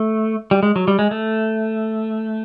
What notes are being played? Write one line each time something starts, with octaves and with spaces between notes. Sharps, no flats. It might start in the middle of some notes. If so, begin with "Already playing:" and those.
Already playing: A3
G3
G#3
F#3
G3
G#3
A3